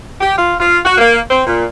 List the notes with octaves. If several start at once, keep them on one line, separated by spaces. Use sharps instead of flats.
G4
F4
F4
F#4
A#3
C4
A#2